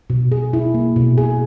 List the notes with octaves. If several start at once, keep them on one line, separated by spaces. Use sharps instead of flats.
B2
G#4
E4
A#3
B2
G#4